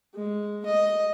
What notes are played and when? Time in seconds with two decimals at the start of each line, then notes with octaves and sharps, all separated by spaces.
0.14 G#3
0.66 D#5